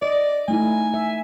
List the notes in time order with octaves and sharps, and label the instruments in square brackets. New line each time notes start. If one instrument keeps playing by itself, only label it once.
[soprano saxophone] D5 [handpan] D#5
[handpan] A3 D#4 E4 [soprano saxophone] G#5
[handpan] E5